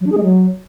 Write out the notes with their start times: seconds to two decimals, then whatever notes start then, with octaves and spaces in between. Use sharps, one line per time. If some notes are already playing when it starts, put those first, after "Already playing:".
0.01 F#3
0.06 D4
0.12 G#4
0.17 G#3
0.23 F#3